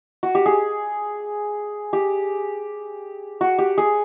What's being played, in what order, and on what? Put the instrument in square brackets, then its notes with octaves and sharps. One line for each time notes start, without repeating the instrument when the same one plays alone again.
[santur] F#4
G4
G#4
G4
F#4
G4
G#4